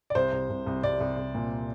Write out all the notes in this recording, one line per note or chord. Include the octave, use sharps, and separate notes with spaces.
D5
C2 C5
C2
C2
C2
C2 D5
C2
C2
A#2